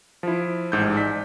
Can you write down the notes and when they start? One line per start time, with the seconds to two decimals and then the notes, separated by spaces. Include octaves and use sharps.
0.23 F3 E4
0.72 A1 G#2 G6
0.97 D5 B6